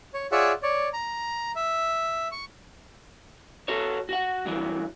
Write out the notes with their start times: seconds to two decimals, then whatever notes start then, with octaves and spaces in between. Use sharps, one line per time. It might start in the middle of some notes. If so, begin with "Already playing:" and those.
0.14 C#5
0.32 F4 G#4 C#5 D5 E5 F#5
0.63 C#5 D5
0.93 A#5
1.56 E5
2.32 C#6
3.68 F#4 A4 C#5
4.09 F#4 F#5
4.46 G2 E3 F#3